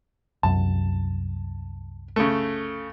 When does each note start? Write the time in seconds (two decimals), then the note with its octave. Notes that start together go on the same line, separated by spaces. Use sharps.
0.43 C2 F#2 A5
2.16 C#3 A3